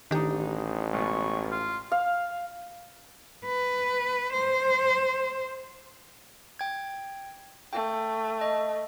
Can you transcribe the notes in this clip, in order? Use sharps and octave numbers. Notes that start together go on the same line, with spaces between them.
A1 D#3 D4 D#4 G4
C#2 B2 B3 C#6
F4
F5
B4
C5
G5 G#6
A3 G5
D#5